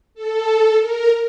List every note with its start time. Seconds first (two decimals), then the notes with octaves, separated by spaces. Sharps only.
0.14 A4
0.79 A#4